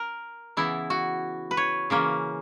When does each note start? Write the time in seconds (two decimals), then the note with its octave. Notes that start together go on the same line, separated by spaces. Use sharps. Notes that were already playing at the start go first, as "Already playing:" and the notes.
Already playing: A#4
0.57 C#3 E3 B3 E4
0.90 F#4
1.51 B4
1.57 C#5
1.90 C#3 E3 A#3 C#4